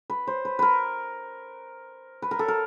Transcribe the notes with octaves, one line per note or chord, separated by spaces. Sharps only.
B4
C5
B4
A#4 B4
B4
A#4
A4
A#4